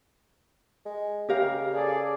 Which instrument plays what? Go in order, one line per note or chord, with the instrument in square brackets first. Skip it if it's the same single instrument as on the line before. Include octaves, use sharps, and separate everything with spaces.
[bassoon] G#3
[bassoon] C#3 [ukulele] G4 A#4 F5
[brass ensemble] G#4 A4 D5